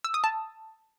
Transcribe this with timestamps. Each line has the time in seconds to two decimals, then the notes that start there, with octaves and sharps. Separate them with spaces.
0.04 E6
0.14 D#6
0.24 A5